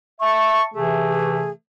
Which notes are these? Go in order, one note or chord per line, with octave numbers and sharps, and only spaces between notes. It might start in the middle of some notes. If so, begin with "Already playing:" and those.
E5 A5 C#6
C3 E3 A3 G#4